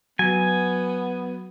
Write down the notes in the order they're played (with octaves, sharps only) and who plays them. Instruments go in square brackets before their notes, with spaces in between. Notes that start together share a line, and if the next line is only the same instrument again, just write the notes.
[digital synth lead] F#3 [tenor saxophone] B3 [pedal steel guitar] G#5